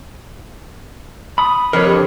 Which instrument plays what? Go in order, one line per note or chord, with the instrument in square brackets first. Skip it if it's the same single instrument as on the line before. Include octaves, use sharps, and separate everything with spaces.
[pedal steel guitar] B5 D#6
[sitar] F2 [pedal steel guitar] A#4 C#5
[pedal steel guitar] D3 [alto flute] G4